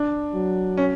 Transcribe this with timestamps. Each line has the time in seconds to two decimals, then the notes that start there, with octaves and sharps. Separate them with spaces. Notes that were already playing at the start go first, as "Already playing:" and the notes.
Already playing: D4
0.34 F#3
0.77 C#4